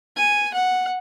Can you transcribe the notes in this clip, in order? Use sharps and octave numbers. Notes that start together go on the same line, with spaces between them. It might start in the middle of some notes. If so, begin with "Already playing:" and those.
G#5
F#5